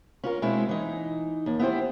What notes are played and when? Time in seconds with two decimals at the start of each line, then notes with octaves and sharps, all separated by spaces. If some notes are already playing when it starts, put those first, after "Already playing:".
0.23 C#4 F4 A#4
0.42 B2 G#3 C4 C#4 E4
0.69 E3 D#4
1.46 D#2
1.59 B3 E4 G4 C5